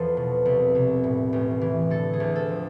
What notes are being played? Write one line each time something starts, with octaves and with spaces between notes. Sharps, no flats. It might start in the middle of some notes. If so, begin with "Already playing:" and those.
Already playing: E2 F3 A4 C5
B2
C2
C2
A2
A1
E3
D3 A4
G#4
D2
A4
F3